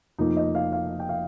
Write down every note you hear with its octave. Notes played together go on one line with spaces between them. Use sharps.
F1 F2 F3 A#3 D#4
D#5
F5
F5
G5
F5